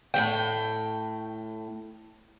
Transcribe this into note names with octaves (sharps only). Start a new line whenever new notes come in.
A2 G3 G5